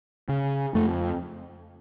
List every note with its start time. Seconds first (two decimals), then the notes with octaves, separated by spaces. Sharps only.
0.29 C#3
0.75 F2 A3